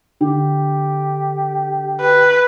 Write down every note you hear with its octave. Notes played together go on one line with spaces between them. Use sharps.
D3 G4
B4